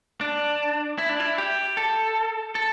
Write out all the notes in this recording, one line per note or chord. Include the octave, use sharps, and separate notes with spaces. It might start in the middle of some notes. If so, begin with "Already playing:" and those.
D4
E4
D4
E4
G4
A4
A4